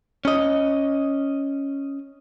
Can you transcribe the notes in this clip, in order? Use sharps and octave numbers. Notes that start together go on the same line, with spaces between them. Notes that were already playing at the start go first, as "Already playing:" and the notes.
C#4 D#5